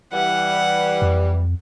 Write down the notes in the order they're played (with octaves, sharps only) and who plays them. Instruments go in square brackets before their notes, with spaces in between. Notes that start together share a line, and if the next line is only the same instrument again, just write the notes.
[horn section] E3 G3 [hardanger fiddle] F#5
[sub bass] F2